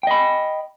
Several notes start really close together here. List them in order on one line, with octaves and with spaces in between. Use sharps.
G5 D#5 B5